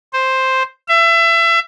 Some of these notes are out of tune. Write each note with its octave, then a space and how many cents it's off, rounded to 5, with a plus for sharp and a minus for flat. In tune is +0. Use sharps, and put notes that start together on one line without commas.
C5 +5
E5 +30